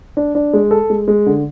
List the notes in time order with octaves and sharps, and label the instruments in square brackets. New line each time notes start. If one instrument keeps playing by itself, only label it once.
[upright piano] D4
D4
G#3
A4
G#3
G#3
D3